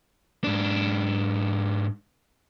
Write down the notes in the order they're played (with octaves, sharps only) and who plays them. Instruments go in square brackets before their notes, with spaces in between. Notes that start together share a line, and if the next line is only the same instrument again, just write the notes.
[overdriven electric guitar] G#2 D4